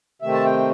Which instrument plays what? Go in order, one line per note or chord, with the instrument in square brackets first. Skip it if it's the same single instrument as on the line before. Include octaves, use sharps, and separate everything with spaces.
[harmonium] C3 D#3 A3 C4 E5
A5
G5